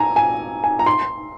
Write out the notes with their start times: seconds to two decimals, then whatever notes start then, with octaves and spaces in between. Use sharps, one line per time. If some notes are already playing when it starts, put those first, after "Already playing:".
Already playing: G#5 A#5
0.16 G#5
0.64 G#5
0.79 A#5
0.86 C6